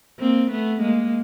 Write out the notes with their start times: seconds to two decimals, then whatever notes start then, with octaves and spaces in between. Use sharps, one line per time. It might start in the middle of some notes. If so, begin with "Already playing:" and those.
0.20 A#3 C4
0.52 A3 B3
0.82 G#3 A#3